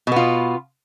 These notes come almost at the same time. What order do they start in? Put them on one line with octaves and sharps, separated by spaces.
B2 B3 F4